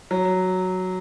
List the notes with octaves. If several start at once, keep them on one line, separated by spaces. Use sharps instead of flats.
F#3